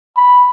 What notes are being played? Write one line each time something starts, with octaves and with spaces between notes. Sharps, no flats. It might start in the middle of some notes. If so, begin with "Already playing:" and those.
B5